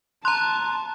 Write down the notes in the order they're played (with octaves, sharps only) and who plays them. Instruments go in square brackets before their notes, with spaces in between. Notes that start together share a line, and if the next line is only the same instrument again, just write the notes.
[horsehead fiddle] A5 [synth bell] A#5 C6 [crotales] F#6